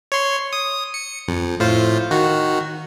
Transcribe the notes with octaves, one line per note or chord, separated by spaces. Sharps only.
C#5 C6
D#6
C#7
F2
A2 F4 C5
D#3 F#4